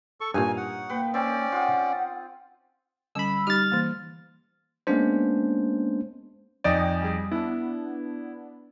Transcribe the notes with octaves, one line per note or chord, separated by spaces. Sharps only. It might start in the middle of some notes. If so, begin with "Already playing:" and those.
A4 C#6
G2 A#2 D#4 C#5 F5 G#5
F#5
A#3 B4 G5
C4 C#4 D5
F4 F#5 D#6
D3 G3 C#4 B5 E6
G3 D#4 G4 F6 A6
E3 A#3
G#3 A#3 B3 C#4 D4 C5
F2 D#4 D5 G5 G#5 D#6
G3 G#4
B3 D4 E4